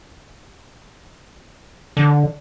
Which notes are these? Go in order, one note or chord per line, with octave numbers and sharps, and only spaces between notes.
D3